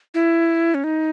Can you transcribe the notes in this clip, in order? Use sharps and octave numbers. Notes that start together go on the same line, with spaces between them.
E4
C#4
D#4